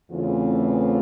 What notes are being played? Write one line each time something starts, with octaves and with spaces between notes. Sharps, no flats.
E2 C#3 E3 A3 C4 F4